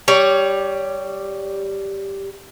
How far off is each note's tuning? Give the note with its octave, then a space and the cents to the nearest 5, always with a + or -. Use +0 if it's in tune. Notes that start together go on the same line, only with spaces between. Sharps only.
G3 +0 C#5 +20